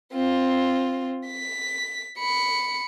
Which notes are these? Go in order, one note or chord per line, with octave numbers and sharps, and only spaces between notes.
C4 F4
B6
B5 C#7